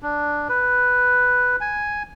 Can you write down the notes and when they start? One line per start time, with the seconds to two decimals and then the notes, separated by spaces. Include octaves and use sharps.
0.02 D4
0.49 B4
1.61 G#5